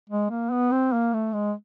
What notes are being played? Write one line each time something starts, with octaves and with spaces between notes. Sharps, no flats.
G#3
A#3
B3
C4
A#3
A3
G#3